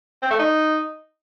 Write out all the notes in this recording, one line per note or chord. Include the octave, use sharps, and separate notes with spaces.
C4
A3
D#4